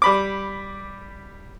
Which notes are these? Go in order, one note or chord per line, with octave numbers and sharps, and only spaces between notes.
G3 B5 D6